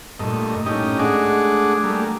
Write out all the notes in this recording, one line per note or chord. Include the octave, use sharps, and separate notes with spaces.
G2 A#2 A3 D#5
A2 C#4 D#4 G4 D#5
G#3 A3 D4 G#4 F#5 D6
G3 A3 A#3